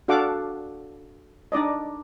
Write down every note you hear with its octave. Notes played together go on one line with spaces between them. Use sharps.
D4 F#4 A4 F5 F#5 D6
D4 D#4 D5 D#5